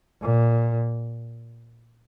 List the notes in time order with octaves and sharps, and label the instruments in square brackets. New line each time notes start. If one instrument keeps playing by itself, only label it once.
[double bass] A#2